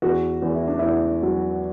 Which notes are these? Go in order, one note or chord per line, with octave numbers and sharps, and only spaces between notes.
E2 F#4
E2
E4
D4
E2 E4
F#3